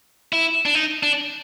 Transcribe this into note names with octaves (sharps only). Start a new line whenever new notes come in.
E4
D4
D#4
D4